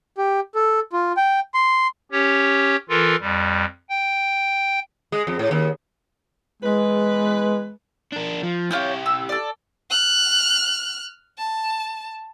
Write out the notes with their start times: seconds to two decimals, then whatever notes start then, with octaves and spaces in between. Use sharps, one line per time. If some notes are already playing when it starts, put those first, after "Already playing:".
0.18 G4
0.55 A4
0.93 F4
1.17 G5
1.54 C6
2.12 C#4 G4 C#5
2.89 E3 F4 A4 A#4
3.20 F2 G3
3.90 G5
5.12 G#3
5.27 F2
5.39 A2
5.51 D#2
6.62 E2 G#3 B4
8.13 D4 A#4
8.43 F3
8.71 E4 F4 G4 C#5 G6
9.06 E6
9.29 A4 D5
9.91 F6 F#6
11.38 A5